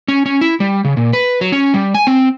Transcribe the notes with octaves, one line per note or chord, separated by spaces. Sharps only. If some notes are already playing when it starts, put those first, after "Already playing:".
C#4
C#4
E4
G3
C#3
A#2
B4
F#3
C#4
G3
G#5
C4